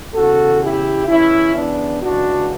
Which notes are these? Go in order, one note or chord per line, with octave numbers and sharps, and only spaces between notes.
E2 C#3 E3 F#4 A4
E4 G4
E2 C#3 E3 C#4 E4
B3 D4
C#2 C#3 E3 D4 F#4